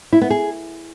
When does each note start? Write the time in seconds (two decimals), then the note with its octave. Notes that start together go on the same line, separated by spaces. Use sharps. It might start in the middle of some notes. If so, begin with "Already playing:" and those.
0.13 E4
0.21 B3
0.30 G#4